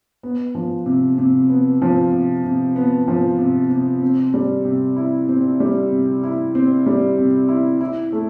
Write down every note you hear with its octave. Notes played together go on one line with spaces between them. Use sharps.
B3
F3
C3
C3
B3
F3
C3
C3
B3
F3
C3
C3
C4
G3
C3
E4
C4
G3
C3
E4
C4
G3
C3
E4
E4
A3